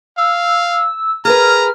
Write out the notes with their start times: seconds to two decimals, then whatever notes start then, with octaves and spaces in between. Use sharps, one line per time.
0.18 F5 E6
1.25 G#4 A#4 B4 A#5 F6